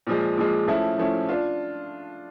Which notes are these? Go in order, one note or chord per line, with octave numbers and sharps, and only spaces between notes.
A#2 F3 G#3
A#2 F3 G#3
F3 A3 C#4 E4
F3 A3 C#4 E4
D4 F4